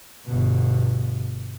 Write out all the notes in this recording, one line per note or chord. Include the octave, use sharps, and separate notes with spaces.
G1 B2